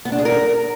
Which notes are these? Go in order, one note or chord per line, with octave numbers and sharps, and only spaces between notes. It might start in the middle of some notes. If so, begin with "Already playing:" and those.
B3
D4
G#4
A#4